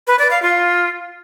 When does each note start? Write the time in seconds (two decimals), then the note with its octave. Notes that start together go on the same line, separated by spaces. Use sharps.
0.07 B4
0.19 D5
0.31 F5
0.42 F4